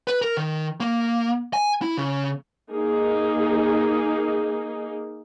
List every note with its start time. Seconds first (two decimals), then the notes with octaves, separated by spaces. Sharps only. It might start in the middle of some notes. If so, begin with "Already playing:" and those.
0.08 B4
0.22 A#4
0.37 D#3
0.80 A#3
1.53 G#5
1.82 E4
1.97 C#3
2.72 A#3 D#4 G#4